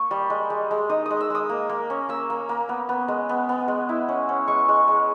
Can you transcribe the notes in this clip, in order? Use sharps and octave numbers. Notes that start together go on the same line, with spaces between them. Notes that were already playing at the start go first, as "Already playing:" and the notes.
Already playing: A#3 C#6
G3
G#3
G#3
G#3
D#4 D#6
G#3 D#6
E6
G#3 D#6
A#3
A#3
C#4
A#3 E6
A#3
A#3
B3
B3
G#3
B3
B3
G#3
E4
C#4
C#4
G#3 C#6
G#3
G#3